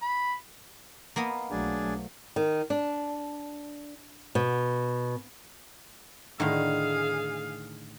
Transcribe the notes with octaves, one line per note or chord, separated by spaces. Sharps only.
B5
A#3 B3 D#5
B1 F#3 A3 D4 G#4
D#3
D4
B2
A2 D3 D#3 G#4 F5